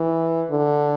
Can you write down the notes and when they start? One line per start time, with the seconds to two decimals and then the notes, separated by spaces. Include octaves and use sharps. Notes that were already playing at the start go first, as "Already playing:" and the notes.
Already playing: E3
0.50 D3